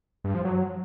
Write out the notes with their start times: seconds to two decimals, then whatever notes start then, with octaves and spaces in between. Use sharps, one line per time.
0.24 G2
0.34 F3
0.45 F#3